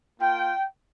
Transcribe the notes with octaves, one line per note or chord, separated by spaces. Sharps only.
A#3 F4 G5